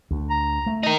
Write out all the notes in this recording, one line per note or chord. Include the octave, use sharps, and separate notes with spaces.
D2
A#5
A3
D#4 A#4